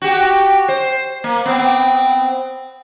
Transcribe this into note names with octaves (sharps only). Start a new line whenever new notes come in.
F#4 G4
C5
A#3
B3 C4